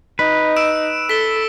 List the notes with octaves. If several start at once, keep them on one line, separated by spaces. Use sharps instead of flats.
D#4 B4
E6 D7 E7
A4 B6 G7